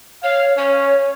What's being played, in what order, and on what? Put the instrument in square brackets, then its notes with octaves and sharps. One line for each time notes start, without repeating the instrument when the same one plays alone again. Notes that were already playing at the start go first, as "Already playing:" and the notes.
[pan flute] C#5 [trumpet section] F5
[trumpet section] C#4 [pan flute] C#5